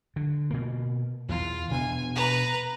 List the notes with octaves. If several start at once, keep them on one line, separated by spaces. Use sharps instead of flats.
D3
B2 A#3
E2 E3 F4
B2 B3 D4 G#5
B4 A#5